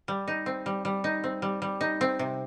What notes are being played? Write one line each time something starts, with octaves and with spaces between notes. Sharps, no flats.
G3
D#4
C4
G3
G3
D#4
C4
G3
G3
D#4
C4
C3